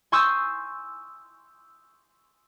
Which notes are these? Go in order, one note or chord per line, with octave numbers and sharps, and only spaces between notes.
G#5 C6 C#6 D#6 E6 G6